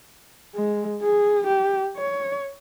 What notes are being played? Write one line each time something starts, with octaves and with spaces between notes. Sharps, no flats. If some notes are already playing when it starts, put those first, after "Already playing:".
G#3
G#4
G4
C#5